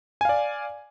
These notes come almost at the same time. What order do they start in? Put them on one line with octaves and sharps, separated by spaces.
G#5 F5 D5